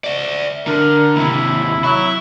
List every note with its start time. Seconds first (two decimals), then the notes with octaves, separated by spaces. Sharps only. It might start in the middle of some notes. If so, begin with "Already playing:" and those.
0.04 D5 E5
0.67 D3 A#4
1.16 D#2 C3 E4
1.84 F#3 E4